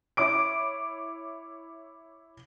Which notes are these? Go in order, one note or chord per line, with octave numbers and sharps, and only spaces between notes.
E4 C#5 D6 D7